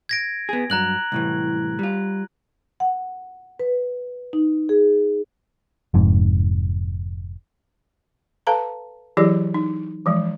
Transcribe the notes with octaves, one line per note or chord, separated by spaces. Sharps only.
G#6 A#6 D7
B3 G#4
G2 F#3 A#5 F#6 F#7
C2 A2 E3
G3 F4
F#5
B4
D#4
G#4
F1 F2 G#2
A4 B4 F5 A5 A#5
E3 F#3 E4 G4 G#4 D5
D#4
E3 F3 G#3